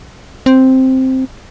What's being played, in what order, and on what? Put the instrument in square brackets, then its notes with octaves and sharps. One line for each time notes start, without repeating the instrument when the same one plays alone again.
[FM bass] C4